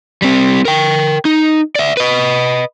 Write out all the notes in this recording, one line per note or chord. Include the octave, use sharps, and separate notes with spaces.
G3 C4
A#4 G5
D#4
D5 E5
B4 D#5